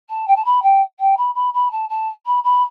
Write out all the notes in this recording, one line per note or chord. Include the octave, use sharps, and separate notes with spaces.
A5
G5
A5
B5
G5
G5
B5
B5
B5
A5
A5
B5
B5